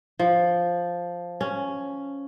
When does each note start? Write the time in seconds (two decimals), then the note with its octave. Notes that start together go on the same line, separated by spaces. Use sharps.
0.19 F3
1.41 C#4